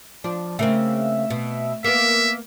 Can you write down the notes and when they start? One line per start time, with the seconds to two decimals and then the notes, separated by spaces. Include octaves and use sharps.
0.24 F3 D4
0.59 C#3 A3 A#3 C4 E5
1.30 B2
1.84 A#3 B3 E5